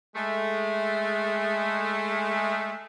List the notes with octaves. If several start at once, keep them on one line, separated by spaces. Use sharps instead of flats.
G#3 A3